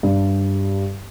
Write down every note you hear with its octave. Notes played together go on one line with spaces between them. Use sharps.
G2